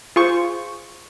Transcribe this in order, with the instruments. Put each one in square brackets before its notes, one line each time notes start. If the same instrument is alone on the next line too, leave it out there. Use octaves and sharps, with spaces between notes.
[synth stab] F4 G#4 C5 C#6